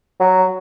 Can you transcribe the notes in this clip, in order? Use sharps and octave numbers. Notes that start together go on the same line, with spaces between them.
F#3